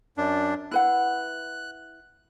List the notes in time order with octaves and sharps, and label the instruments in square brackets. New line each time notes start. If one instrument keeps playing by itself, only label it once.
[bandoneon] F#2 D4
[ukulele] E4 B4 F#5 [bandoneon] F#6